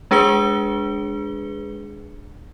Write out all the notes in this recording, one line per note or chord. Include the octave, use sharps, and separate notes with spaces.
G#3 D4 G#4 B4 C#7 G7